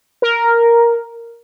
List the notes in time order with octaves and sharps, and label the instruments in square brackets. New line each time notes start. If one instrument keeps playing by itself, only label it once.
[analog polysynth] A#4